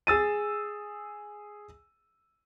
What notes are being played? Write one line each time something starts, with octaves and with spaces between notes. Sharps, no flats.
G#4 E6 A6 D#7